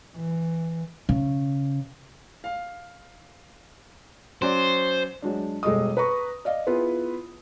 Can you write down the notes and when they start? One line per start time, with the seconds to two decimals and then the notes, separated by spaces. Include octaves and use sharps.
0.16 E3
1.09 C#3
2.44 F5
4.42 F#3 C#4 C5 D5
5.22 F#3 G#3 D4
5.63 E1 G3 G#3 A4 D#5 D#6
5.97 B4 A#5 C#6
6.45 D5 D#5 F5
6.67 B3 E4 F4 G#4 B4